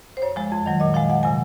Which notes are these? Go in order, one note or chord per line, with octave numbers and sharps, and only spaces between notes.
C5
F#2 C#5
F3 G#3
F2
D#3 F#3
A#2 D#5
F3 G#3 F5
F2 F#5
C3 F#3 G#5